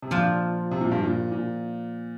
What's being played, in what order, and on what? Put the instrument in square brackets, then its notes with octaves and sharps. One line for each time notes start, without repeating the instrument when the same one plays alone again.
[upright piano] C3
[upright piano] A#2 [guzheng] F3 D4 F4
[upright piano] C3
A#2
G2
A#2
A#2